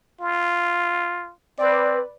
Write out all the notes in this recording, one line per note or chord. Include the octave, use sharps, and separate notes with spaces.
F4
C4 B4 D5